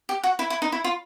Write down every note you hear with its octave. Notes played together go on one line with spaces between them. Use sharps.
G4
F#4
E4
E4
D#4
E4
F4